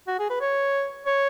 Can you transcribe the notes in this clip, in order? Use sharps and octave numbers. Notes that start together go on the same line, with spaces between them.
F#4
G#4
B4
C#5
C#5